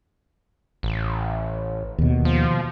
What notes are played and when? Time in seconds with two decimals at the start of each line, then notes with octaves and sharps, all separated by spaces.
0.83 A1
1.98 D#2 B2
2.25 F3